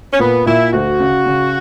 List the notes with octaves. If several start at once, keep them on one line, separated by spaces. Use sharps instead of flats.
C#4
A#2 B3
A#2 E4
D2 F#4
C#3
C#3